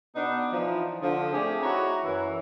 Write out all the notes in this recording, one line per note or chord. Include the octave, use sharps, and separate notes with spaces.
B2 B3 D4 D#4
E3 F3 D#4
D3 F3
A3 C4 G4 G#4
D#4 E4 F#4 C#5 F#5 A#5
F#2 E3 F#3